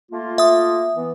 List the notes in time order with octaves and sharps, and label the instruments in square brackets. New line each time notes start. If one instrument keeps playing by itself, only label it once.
[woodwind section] A3 A#3 F4
[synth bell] E5 D#6
[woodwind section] E3 B3